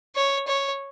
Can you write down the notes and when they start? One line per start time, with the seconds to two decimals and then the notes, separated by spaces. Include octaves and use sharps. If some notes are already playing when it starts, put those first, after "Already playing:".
0.16 C#5
0.47 C#5